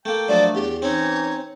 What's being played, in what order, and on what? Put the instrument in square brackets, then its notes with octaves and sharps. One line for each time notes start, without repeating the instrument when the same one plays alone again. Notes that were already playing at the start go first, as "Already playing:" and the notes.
[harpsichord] A3 A#3 [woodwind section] G5
[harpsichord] F3 F#3 A#3 [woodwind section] A3 D4 [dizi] D5
[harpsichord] E2 [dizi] G4
[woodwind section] E3 D#4 [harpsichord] C4 C#4 [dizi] C#5